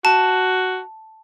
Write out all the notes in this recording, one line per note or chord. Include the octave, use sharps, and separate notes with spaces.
F#4 A5